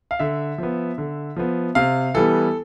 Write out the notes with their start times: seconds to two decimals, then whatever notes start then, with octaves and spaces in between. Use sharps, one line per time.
0.11 F5
0.19 D3 E5
0.58 F3 B3
0.98 D3
1.36 F3 B3
1.75 C3 F5
2.14 E3 G3 B3 A4